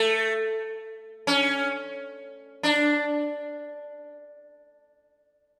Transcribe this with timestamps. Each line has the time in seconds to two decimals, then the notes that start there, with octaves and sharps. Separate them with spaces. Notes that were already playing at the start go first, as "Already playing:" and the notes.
Already playing: A3
1.27 C#4
2.63 D4